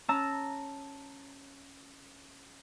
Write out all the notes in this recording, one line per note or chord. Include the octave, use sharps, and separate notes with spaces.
C#4 A5 A#5 E6